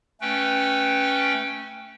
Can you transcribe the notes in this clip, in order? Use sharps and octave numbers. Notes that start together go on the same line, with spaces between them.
A3 C#4 B4 G5